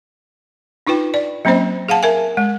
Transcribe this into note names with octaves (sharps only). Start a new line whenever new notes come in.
D4 D#4 F4 B4 G5
D5
F#3 A#3 C4 C#4 C5 D#5
G#4 F5 F#5 A5
A#4 E5 G#5
G#3